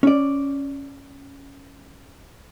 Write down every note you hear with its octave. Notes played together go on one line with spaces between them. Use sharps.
C#4 D5